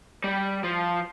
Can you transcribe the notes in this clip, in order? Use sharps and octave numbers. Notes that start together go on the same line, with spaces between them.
G3
F3